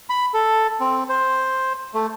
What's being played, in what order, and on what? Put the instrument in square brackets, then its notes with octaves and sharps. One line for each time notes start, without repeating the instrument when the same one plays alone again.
[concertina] B5
A4
C4
C5
A3